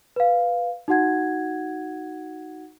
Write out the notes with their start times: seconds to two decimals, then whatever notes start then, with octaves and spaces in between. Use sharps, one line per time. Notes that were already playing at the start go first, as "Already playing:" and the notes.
0.16 B4 F5
0.88 D#4 F#4 F#5 G#6